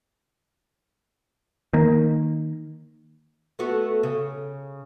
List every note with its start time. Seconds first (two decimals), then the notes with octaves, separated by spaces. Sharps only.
1.73 D#3 A#3
3.59 A3 B3 F#4
4.03 C#3